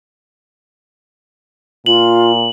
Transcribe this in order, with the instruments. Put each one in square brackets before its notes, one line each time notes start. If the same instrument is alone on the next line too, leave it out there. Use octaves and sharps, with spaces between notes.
[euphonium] A#2 [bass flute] F4 [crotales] F#7